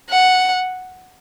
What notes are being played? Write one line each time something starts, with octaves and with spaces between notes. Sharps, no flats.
F#5